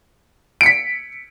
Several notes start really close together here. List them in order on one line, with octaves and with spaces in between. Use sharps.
D7 C#7 B6